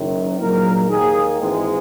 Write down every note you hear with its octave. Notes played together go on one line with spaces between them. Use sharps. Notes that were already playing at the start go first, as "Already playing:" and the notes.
Already playing: F#1 F#2 D#3
A#1 G#2 F#3 A#3 A#4
D#2 D#3 A#3 G#4
G#1 G#2 E3 G#3